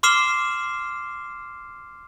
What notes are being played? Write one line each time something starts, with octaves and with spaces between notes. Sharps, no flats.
C6 D6 F6 C7 E7 G7